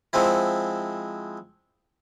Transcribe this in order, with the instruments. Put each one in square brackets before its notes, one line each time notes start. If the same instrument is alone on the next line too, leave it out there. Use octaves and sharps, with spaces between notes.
[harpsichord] F3 G#3 C4 E4